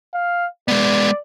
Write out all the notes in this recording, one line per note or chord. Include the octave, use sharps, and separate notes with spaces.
F5
G#3 B3 D5